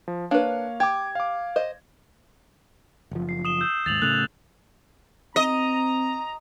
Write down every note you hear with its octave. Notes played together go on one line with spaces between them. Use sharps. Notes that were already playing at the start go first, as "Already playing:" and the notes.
F3
A#3 D4 B4 C#5 F5
G4 D6 G#6
F5 D6
C5 D#5
F#1 F3
C7
D#6 E7 G7
E6 G6
D#2 G#2 A6 F7 F#7
A2 C#3 A3 F#6 F7
C4 D#5 A#5